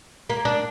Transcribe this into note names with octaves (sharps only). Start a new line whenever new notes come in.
A#3
D4